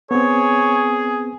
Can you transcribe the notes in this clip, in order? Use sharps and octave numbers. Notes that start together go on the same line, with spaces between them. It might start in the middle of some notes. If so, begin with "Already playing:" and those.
B3 C4 G#4 C#5